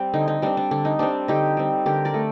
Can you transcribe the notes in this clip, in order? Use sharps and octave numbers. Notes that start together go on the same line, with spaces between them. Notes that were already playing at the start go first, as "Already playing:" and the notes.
Already playing: G3 C4
D3 D#4
D#4
G3 C4 D4
D4
D3 D4
D#4
G3 C4 D4
D3 D#4 G4
G3 C4
D3 G4 A#4
A#4 D5
A3